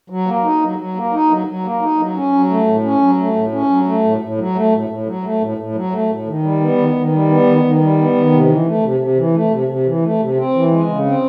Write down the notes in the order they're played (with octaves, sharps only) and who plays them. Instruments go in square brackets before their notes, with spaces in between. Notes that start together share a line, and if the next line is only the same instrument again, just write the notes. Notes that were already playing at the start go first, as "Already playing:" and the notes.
[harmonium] F#3
A#3
D#4
F#3
F#3
A#3
D#4
F#3
F#3
A#3
D#4
F#3
C#4
F#3
A3
A2
C#4
F#3
A3
A2
C#4
F#3
A3
A2
A2
F#3
A3
A2
A2
F#3
A3
A2
A2
F#3
A3
A2
D#3
G3
B3
D#3
D#3
G3
B3
D#3
D#3
G3
B3
D#3
C3
E3
A3
C3
C3
E3
A3
C3
C3
E3
A3
C3
C4
E3
G#3
C#3
C4